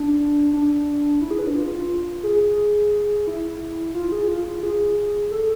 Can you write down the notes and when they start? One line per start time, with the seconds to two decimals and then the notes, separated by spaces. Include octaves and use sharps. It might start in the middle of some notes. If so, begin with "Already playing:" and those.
Already playing: D4
0.53 D4
1.21 E4
1.31 G#4
1.39 B4
1.47 D4
1.56 F4
2.23 G#4
3.27 E4
3.94 F4
4.12 G#4
4.28 F4
4.46 F4
4.63 G#4
5.31 A4